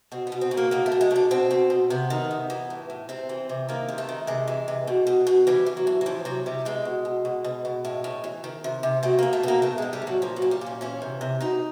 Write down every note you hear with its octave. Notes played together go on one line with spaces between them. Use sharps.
B2 C4
B3
B2
C4
B2
A#3
B2 A#3
A3
B2
G#3
B2
D4
B2 C4
B2
B2
C3 B3
D#3
C3
E3
A2
A2
C3 C4
E3
C3
D#3 A#3
C3
A3
D#3
C3 G#3
E3
C3
B2
B2
B2
E3 G3
E3
F#3
A2
F#3
E3 F3
C3 F#3
C3 G3
B2 G#3
B2
B2
B2
B2
B2
A2
A2
E3
D#3
C3
C3
B2 A3
B2 A#3
A3
B2 A#3
A2 A3
A2 G#3
G3
A2
F#3
A#2 F3
F#3
A#2
G3
A#2
C#4
E3 C#4
C3
C3
B2 D#4